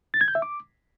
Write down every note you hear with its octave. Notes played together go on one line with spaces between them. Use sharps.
A6
G#6
G6
E5
D6